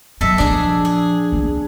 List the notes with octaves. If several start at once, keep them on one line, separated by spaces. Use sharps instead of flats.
F#3 C4 A4 D#5 E5
A#2 F3 D4 G#4
G#4
A#3 C4